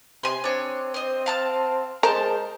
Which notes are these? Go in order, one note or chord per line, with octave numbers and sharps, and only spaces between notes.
C3 G#5 C6
C4 D4 C#5
C5 D#5
F5 A5 F6
G#3 A#4 C5 A5